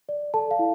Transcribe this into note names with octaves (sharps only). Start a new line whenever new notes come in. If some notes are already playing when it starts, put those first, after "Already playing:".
D5
A4 D5 A5
F5
E4